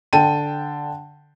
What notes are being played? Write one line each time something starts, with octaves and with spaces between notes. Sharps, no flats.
D3 G5 A5 D#7